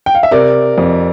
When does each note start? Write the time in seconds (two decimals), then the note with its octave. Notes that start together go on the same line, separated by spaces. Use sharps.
0.06 G5
0.15 F5
0.23 E5
0.31 C3 A#4 D5
0.78 F2